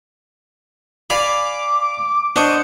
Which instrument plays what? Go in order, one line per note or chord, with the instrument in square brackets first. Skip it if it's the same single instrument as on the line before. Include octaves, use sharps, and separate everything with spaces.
[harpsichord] D5 F5 B5 [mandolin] G#5 [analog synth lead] D6
[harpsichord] D4 C#6 [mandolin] C5 D#5 G6 [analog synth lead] F#5